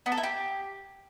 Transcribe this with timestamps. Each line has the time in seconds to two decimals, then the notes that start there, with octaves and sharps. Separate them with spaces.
0.06 B3
0.12 A4
0.18 E4
0.23 G4